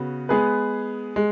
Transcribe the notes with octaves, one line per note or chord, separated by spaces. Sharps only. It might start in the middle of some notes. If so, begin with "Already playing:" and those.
Already playing: C#3 B3 F#4
G#3 B3 G#4 B4
G#3